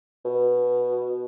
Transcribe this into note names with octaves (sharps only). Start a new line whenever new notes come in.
B2